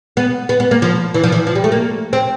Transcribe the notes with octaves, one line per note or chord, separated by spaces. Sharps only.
B3
B3
B3
A#3
F3
E3
F3
E3
F3
G3
A3
A#3
C4